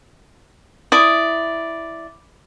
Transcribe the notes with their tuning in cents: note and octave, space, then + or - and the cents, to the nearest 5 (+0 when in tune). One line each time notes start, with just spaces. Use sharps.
E4 +0 D5 +0 D#6 +0